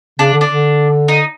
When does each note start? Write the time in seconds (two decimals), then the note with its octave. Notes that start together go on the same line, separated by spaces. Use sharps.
0.19 C#3 D4
0.34 D3
0.41 D4
0.49 D3
1.08 D#4